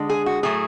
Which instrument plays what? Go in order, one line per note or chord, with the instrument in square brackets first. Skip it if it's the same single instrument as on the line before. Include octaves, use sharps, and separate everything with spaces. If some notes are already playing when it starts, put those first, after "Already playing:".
Already playing: [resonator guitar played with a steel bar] D3 G#3
G#4
F#4
A2 F#3 A3 G#4